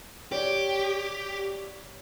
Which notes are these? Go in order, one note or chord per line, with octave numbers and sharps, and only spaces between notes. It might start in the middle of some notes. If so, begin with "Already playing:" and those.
G4 C#5 D5